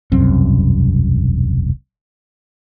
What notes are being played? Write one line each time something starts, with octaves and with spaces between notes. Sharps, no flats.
E1 C2 F#2 C4